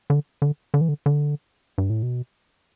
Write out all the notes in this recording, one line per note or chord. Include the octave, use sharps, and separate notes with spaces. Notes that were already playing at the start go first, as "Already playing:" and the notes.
D3
D3
D3
E3
D3
D3
G2
A2
B2